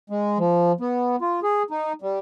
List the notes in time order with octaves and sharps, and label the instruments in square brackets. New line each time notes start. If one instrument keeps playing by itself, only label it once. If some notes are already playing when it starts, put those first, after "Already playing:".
[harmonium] G#3
F3
B3
F4
G#4
D#4
G3